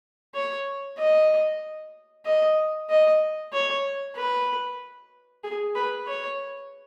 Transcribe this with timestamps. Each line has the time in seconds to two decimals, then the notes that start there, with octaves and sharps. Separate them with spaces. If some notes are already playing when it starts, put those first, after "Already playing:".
0.35 C#5
0.98 D#5
2.25 D#5
2.90 D#5
3.53 C#5
4.16 B4
5.43 G#4
5.75 B4
6.07 C#5